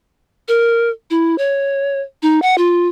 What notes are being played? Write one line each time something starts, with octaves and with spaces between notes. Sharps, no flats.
A#4
E4
C#5
D#4
F#5
F4